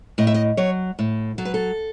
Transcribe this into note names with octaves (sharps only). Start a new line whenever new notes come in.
A2 D#5
E5
D#5
F#3 C#5
A2
F#3 A4
B4
A4